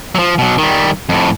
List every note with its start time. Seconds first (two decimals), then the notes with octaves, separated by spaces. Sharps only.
0.15 F3 F#3
0.38 B2 F#3
0.58 D#3 G3
1.09 F2 A2